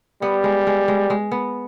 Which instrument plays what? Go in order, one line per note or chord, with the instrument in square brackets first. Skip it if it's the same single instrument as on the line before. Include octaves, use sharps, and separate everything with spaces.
[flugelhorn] G3 [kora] B3
[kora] G#3
G#3
G#3
G#3
B3